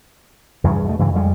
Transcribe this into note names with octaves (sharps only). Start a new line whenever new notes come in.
E2 G2 C#3
B2 A3
G2 C#3 E3 F#3
F2 G3 G#3